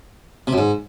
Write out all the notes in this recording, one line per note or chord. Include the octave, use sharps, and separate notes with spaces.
C3
F#2
G#2